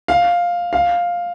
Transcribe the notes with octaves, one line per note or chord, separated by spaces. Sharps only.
F5
F5